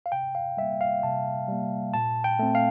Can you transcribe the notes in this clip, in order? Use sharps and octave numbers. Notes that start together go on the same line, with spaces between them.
F5
C3 G5
F5
G3 A#3 E5
F5
C3 A5
G3 A#3
A#2 A5
G5
A3 C4
F5